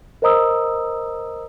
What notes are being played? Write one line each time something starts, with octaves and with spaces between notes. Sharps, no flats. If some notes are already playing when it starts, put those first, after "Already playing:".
A#4 C5 D#5 A#5 D#6 E6